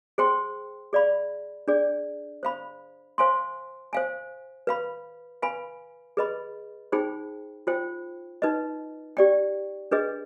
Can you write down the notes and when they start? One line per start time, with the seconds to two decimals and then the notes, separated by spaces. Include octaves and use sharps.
0.18 G#4 C5 G5 C6
0.93 G#4 D5 F5 B5
1.68 D4 G#4 D5
2.43 C5 F5 B5
3.18 C5 F5 G#5 C6
3.93 C5 F5 G#5
4.67 B4 F5 B5
5.42 B4 F5 G#5 B5
6.17 G#4 B4 D#5 B5
6.92 D#4 G#4 C5 G5 B5
7.67 F4 C5 G5
8.42 D#4 B4 D#5
9.17 G4 D5 G5
9.91 D4 G#4 B4 D#5